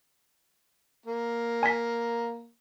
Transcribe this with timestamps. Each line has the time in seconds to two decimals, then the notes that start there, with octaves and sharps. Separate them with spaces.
1.06 A#3
1.63 G#5 B6